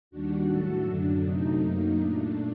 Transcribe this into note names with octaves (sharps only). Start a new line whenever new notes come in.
D#2 D#3 G3 D4 F#4
A2 F#3 A3 F#4 A4
F#2 D3 F#3 D4
C3 F#3 A3 D#4
F#2 F#3 A#3
A#2 A3 D4